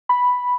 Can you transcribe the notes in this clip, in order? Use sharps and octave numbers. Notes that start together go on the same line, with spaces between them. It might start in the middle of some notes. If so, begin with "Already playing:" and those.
B5